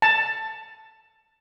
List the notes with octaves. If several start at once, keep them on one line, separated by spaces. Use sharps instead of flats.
A5